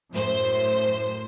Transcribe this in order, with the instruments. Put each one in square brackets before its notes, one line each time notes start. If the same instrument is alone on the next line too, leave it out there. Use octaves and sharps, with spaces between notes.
[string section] F#2 A2 C5